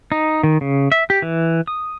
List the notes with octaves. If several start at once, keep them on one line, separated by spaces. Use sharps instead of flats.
D#4
D#3
C#3
E5
G4
E3
D#6